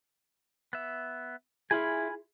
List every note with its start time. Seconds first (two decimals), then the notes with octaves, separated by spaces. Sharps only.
0.73 B3 E5
1.71 E4 F4 G#4 G#5 B5 F6